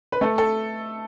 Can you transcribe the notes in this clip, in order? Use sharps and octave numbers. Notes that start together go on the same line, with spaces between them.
B4
A3 A4
A4